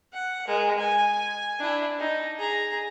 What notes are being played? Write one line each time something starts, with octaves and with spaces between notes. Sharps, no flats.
F#5
G#3 A#4
G#5
D4 E4
D#4
G#4 A#5